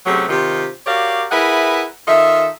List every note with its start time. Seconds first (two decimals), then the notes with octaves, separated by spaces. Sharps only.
0.05 C3 F#3 A3 C#4 G4 G#4
0.29 C3 D#3 F4 G4
0.86 F#4 G4 A#4 C#5 D5 F5
1.31 E4 G#4 A#4 B4 E5 F#5
2.07 D#3 F4 A4 D#5 E5